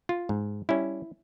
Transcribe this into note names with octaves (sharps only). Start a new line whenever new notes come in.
F4
G#2
G3 C#4 E4